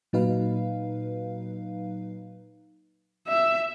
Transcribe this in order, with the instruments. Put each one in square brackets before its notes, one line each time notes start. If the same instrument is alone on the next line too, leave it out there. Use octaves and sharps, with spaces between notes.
[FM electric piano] A#2 F#3 D#4 B4 F5
[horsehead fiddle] E5